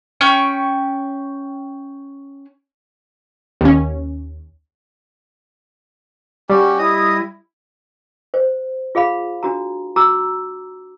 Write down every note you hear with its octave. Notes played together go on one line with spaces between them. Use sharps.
C#4 G5 C#6
D#2 C#4
G3 C#4 F#4 G4
E4 D#5 D#6
C5
F4 G#4 F5 B5
D4 F#4 A#5
F#4 A#5 D6 E6